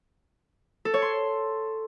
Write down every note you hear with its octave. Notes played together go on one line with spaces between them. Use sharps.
A4
C#5
C6